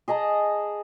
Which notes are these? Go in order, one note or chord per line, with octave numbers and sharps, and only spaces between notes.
G#4 D#5 A5 A#5